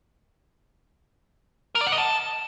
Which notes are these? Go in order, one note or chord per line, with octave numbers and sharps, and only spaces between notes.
A#4
D5
F#5
D#5
A5